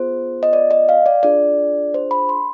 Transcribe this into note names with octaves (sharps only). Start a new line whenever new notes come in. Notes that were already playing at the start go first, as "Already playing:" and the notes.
Already playing: B3 F4 G#4 C5
D#5
D5
D#5
F5
D5
D4 F4 G#4 D5
C5
B5
C6